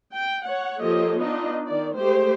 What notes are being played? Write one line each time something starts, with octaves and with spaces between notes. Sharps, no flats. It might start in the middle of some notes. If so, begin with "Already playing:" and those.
G5
C#5 F#5
F3 A#3 G4 A4 C#5 D#5
B3 D4 D#4 F4 D#5
D#3 D5
G#3 A3 G4 C5